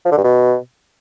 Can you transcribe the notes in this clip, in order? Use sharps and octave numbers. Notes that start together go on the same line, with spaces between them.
F3
D3
G2
B2